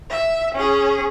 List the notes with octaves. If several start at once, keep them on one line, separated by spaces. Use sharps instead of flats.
E5
C#4 G#4